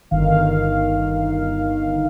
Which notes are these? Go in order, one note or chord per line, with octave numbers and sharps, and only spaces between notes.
G1 D#3 F5